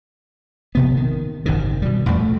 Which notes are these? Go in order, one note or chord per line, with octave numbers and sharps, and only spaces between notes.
A#1 C3 B3
D#3
G#1 F#2 C3 D#3
B2 G3
A1 E2 A#2 G3
A3